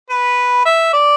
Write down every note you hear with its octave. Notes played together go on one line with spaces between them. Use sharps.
B4
E5
D5